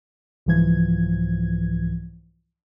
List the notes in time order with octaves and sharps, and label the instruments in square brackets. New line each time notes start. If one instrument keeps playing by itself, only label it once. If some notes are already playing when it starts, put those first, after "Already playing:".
[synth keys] C2 G#2 E3 F3 G#6